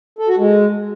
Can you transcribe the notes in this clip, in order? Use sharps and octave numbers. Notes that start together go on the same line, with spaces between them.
A4
F#4
G#3